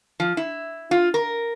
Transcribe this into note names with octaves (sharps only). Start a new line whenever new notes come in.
F3
E4
F4
A#4